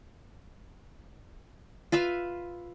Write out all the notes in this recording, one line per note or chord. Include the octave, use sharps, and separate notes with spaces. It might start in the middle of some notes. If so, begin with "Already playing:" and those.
F4 B4 E5 F5